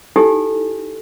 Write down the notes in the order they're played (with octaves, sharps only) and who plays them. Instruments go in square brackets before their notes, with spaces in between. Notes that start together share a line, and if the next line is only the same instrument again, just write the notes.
[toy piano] D#4 E4 G4 A4 G#5